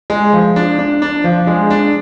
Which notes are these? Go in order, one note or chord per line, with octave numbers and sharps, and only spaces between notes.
G#3
F3
D4
D4
D4
F3
G#3
D4